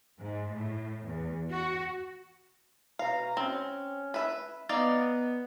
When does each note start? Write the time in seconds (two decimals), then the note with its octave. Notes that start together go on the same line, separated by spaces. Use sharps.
0.18 G#2
0.54 A2
1.07 E2
1.50 F#4
2.99 B2 F5 A#5
3.37 C4 C#4
4.14 B4 E5
4.69 B3 D#4 D5 F5